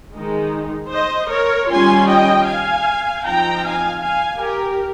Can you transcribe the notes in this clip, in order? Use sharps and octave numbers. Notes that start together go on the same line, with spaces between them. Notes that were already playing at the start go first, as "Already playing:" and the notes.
D#3 G#3 D#4
C5 D#5
A#4 C#5
D#3 G3 C#4 F4 G#5 C6
D#5 G5
F5 G#5
F3 C4 D#4 G5 A#5
F5 G#5
F5 G#5
G4 A#4